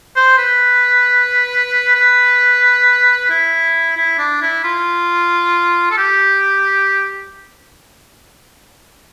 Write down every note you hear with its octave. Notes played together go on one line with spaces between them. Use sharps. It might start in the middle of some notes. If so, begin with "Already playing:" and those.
C5
B4
B4
E4
E4
D4
E4
F4
A4
G4